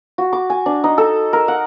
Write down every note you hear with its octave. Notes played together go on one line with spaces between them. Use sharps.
F#4
D6
G#5
D4
D#4
A4
A#4
F#5